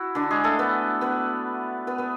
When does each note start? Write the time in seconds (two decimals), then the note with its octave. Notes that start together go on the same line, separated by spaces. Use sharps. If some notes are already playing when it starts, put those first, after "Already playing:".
Already playing: E4 F#4
0.15 D3 D4
0.31 G#3 G#4
0.44 A3 A4
0.59 B3 B4
1.01 B3 B4
1.87 B3 B4
1.98 B3 B4